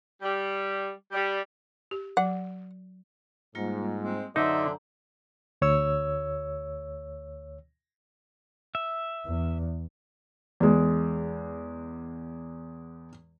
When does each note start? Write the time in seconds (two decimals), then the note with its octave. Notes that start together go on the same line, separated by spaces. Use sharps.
0.21 G3
1.12 G3
1.91 G4
2.17 F#3 F#5
3.55 G#2 G3 A#3 F4
4.04 G#3 C4
4.36 F#2 D3 D#4 C5 D5 E5 A#5
5.62 D2 C#5 E6
8.75 E5
9.26 E2
10.60 E2 G#3